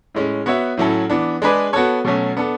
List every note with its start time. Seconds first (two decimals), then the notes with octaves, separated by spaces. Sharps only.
0.15 A2 G#3 C#4
0.46 B3 F#4 C#5 E5
0.77 A2 F#3 C#4 E4 A4
1.10 E3 B3 D4
1.42 G#3 D4 G#4 B4 D5
1.73 B3 F#4 A4 C#5
2.05 B2 F#3 A3 C#4
2.37 B3 D4 A4